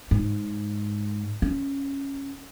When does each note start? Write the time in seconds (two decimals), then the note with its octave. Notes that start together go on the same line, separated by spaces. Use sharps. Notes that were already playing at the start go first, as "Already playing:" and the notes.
0.11 G#2
1.42 C#4